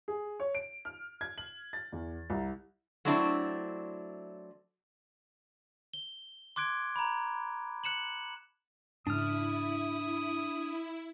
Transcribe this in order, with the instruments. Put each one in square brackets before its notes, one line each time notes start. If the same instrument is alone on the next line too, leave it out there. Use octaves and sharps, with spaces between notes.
[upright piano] G#4
C#5
D7
F6
G#6
F#7
A6
E2
C2
[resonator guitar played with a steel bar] F#3 A3 C4 D4 E4
[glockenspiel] G7
C6 D6 F#6 G#6 D7
A#5 B5
F#6 C#7 E7 F#7
[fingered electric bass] G#2 C#3 [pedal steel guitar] D4 F6 [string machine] E4 [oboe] D#6